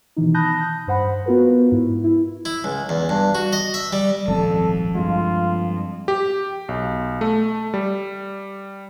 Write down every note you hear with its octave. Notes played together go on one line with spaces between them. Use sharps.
B2 D#3 E3 D#4
A5 B5 D#6 F#6 G6 A#6
G2 C5 F#5 B5
B3 F4 F#4 A#4 B4
G#2 E4
E4
E4
C#2
E2
G2
F#4
D#5
E5
G3
D#1 G#1 F3 C4 A4
G2 G#3 F4
G4
B1
A3
G3